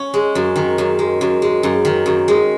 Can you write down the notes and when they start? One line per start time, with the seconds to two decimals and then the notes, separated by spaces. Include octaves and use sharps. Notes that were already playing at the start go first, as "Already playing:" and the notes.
Already playing: C#4
0.14 G#3
0.35 F#2
0.56 D#3
0.78 F#2
0.99 G#3
1.21 F#2
1.42 G#3
1.63 F#2
1.85 D#3
2.06 F#2
2.28 G#3